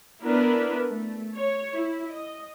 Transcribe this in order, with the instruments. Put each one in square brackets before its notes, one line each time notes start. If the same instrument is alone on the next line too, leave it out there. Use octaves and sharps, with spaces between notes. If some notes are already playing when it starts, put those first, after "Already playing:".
[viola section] B3 D4 E4 A#4 B4
A3
C#5
E4
D#5